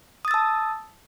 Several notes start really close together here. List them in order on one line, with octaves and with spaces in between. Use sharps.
D#6 A6 E6 A5